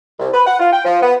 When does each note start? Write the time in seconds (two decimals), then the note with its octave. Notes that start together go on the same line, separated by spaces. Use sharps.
0.19 C2
0.33 B4
0.47 F#5
0.59 F4
0.72 G5
0.85 F3
1.02 B3